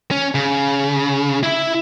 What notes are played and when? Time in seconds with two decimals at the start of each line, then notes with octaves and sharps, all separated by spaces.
0.11 C#4
0.35 C#3
1.43 E4 E5